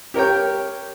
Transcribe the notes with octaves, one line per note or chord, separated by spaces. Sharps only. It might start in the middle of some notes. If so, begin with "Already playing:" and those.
G4 A#4 C#5 G5